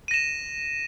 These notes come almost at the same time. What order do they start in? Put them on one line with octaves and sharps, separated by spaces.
D#7 A#6 E7